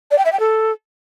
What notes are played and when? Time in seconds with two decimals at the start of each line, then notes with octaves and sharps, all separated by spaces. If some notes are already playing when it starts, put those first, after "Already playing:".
0.11 D5
0.18 G5
0.25 E5
0.32 G5
0.40 A4